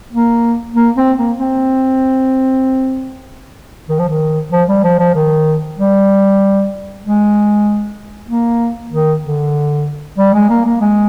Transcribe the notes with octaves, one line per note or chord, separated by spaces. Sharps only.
A#3
A#3
C4
A#3
C4
D#3
F3
D#3
F3
G3
F3
F3
D#3
G3
G#3
A#3
D#3
D3
G3
G#3
A#3
A#3
G#3